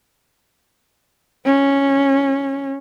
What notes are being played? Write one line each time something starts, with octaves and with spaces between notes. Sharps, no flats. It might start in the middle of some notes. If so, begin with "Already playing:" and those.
C#4